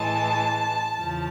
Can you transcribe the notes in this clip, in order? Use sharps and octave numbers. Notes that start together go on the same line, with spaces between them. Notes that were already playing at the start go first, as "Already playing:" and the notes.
Already playing: A2 E3 G#3 A5
E2 C#3 F3